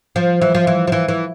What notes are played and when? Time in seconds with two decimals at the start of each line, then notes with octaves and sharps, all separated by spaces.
0.16 F3
0.42 E3
0.55 F3
0.67 E3
0.87 F3
0.92 E3
1.08 E3